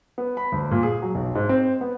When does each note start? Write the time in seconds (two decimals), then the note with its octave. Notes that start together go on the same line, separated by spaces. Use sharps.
0.18 B3
0.37 B5
0.52 D2
0.71 A#2
0.83 G#4
1.02 F#3
1.15 B1
1.35 G#2
1.49 C4
1.81 B3